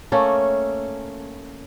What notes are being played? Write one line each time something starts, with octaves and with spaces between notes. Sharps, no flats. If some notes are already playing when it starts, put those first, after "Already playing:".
A3 A#3 C#4 A4